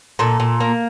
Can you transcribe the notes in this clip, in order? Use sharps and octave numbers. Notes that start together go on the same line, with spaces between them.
A#2 A4
A#2
A#3